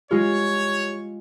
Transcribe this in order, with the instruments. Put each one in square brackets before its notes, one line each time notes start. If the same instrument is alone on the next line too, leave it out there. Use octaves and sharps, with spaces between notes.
[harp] G#3 F4 [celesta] G4 [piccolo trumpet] C#5